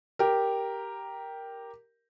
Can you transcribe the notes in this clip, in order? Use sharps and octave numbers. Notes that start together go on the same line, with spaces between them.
G4 A#4